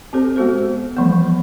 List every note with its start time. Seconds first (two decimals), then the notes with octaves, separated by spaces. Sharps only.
0.13 C4 G4 A4 C5
0.36 G#3 B3 F#4 A4 C5
0.97 E3 F3 G3 A3 B3